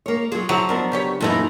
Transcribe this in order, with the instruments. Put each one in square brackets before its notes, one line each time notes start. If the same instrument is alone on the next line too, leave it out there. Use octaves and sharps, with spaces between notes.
[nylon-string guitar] A#3 C#5
[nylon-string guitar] F#3 F4 [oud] G#4
[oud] F3 [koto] F#3 [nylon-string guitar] E4
[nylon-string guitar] B3 D4 A#4
[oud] C#3 G4 C#5
[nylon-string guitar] F#2 A3 E4 [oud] A#2 E3 D#4